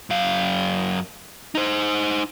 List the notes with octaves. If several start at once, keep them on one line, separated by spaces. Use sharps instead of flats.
F#2 F5
D#4 C5